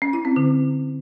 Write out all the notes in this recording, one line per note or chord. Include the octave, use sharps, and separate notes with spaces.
C#4
E4
C4
D3